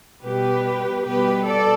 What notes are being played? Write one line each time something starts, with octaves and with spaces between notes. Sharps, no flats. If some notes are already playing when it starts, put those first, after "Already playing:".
B2 G3 B3 G4 B4
B2 G3 B3 G4 B4
A4 D5